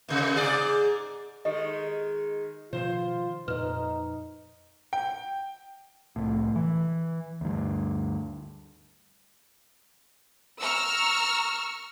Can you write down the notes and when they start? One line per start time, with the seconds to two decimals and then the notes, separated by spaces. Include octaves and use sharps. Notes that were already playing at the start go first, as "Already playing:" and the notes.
0.09 D#2 C3
0.36 G#2 G#4 D5
1.45 D#3 G#3 G4 A4 D#5
2.73 B2 D#3 F3 F4 C5
3.48 F2 A#2 D#4 B4
4.93 G5
6.16 C2 A2
6.56 E3
7.41 D2 G2
10.61 A#5 C#6 E6 F6